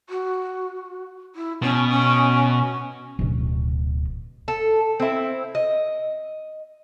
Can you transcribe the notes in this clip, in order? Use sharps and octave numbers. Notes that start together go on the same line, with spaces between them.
F#4
E4
B2 C#4
C#4
D1 B2
A4
C4 E4
D#5